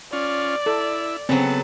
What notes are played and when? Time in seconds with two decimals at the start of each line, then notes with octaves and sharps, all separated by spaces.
0.13 C#4 F4 D5
0.66 E4 A4
1.29 C#3 F#3 B3 C4 A4